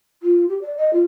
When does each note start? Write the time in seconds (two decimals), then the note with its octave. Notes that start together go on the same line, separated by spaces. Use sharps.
0.23 F4
0.49 G4
0.62 D5
0.77 D#5
0.93 F4